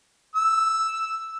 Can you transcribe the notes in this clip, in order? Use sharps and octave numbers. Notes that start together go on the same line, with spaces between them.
E6